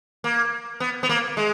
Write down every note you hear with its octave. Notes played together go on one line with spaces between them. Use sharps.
A#3
B3
B3
A#3
G#3